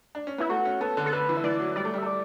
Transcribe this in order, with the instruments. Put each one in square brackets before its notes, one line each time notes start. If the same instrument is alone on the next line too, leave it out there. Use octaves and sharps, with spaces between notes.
[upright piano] D4
C#4
[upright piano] B3 [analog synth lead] E4
[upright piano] A3 [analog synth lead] F#4
[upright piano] C#4
[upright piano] B3 [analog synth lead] A4
[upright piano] D3
[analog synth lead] A4
[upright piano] D3 [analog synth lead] B4
[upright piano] E3
[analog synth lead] E5
[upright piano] E3 [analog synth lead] D5
[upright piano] F#3
[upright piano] G3 [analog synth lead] D5
[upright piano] A3
G3
[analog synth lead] E5
[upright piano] A3 [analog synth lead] D5